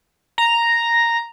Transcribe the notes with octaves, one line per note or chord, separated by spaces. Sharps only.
A#5